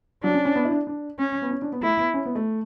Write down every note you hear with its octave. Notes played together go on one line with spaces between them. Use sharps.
F#3 D4
C#4
C#4
B3
E4
D4
D4
C#4
B3
C#4
D4
B3
A3 E4
B3
C#4
B3
A3